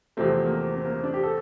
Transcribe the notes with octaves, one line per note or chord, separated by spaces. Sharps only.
E2 C3 F3 A3 C4
A#3
C4
A#3
C4
D4
G4
A4